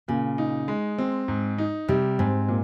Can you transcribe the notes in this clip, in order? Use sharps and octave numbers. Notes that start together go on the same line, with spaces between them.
A#2 C#3
D#4
G#3
C4
G#2
D#4
C3 G3
G#2 C4
A#2